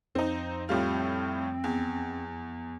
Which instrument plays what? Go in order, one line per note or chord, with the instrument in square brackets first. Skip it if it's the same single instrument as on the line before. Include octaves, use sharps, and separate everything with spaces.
[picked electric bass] F2 [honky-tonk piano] C4 D#4
[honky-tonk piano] A2 G3 F4 [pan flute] C4
[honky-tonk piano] E2